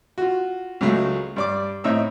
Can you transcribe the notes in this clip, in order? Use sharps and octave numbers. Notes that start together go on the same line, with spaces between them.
F4 F#4
C#2 F#3 G#3 A3
G2 D5 D6
A2 C4 D#4 C#5 E5 E6